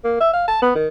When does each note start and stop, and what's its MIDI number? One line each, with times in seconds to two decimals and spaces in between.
0.04 0.18 58
0.21 0.31 76
0.34 0.44 77
0.48 0.59 81
0.62 0.72 59
0.75 0.88 51